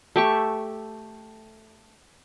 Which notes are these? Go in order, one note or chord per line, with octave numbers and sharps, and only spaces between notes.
A3 G4 E5 C#6